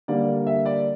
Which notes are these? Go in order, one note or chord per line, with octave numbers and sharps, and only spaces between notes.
D3 G3 A#3 D5
E5
D5